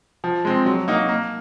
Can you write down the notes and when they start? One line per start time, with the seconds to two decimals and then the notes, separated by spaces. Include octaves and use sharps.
0.24 F3
0.45 G#3 C4
0.66 F#3
0.88 A#3 D#4 F#4
1.09 A#3